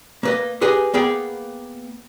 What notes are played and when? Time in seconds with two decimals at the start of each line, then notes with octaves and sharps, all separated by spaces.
0.23 A#3 B4 D#5
0.61 G4 G#4 B4 D#5 G#5
0.94 A#3 B3 G#4 G5